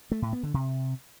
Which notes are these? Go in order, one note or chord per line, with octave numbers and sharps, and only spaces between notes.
A3
A2
B3
D3
C3